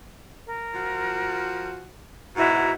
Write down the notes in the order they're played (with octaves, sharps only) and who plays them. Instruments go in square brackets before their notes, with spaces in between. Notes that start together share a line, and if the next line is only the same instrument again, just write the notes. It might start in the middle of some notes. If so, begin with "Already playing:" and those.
[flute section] A#4
[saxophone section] F3 F4 F#4
[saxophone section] G#2 B2 [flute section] E4 F#4 A#5